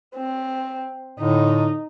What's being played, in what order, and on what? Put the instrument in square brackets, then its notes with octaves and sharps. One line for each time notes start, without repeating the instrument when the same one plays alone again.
[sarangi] C4
[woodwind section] A2 D3 [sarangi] D#4